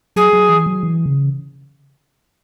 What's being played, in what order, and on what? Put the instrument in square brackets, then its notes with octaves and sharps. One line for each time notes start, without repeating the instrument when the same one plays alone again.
[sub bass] F#3 [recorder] G#4
[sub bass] F#3
E3
F#3
E3
C#3